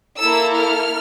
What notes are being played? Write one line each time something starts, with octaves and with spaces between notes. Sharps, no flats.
A#3 E4 A4 E6
F6